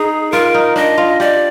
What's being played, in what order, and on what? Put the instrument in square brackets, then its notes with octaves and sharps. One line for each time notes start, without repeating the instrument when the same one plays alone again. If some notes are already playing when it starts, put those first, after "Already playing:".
Already playing: [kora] D#4 [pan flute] G#4
[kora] F4 [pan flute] A#4
[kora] D#4
[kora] D4 [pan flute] D#5
[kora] F4
[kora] G4 [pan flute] D5